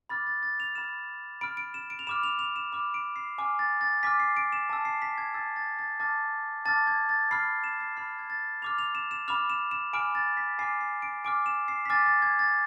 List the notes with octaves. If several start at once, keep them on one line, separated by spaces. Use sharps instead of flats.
B5 D6 F6 A6
A6
A6
F7
B5 F6 E7
B5 F6 D7
D7
E7
D7
F7
B5 D6 F6 E7
F7
F7
E7
B5 D6 F6 F7
D7
C7
G#5 D6 F6
A6
A6
G#5 D6 F6 B6
C7
D7
E7
A5 E6
C7
B6
G#6
A5 E6 A6
A6
A6
A5 D6 F6 A6
A5 D6 F6 A6
G#6
A6
B5 F6 C7
E7
C7
B5 F6 C7
G#6
A6
B5 D6 F6 F7
F7
E7
E7
B5 D6 F6 F7
E7
E7
G#5 B5 D6 F6 D7
A6
B6
G#5 B5 D6 F6 C7
C7
D7
G#5 D6 F6 D7
E7
C7
B6
G#5 D6 F6 A6
A6
G#6
A6